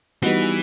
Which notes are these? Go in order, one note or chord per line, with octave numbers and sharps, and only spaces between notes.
E3 G3 B3 D#4 F#4